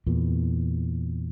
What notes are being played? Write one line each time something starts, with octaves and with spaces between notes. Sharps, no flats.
E2 A#2